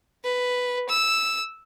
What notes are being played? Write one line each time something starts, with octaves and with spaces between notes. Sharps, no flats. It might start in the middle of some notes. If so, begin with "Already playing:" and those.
B4
E6